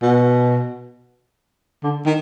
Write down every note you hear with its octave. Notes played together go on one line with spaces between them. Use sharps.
B2
D3
D#3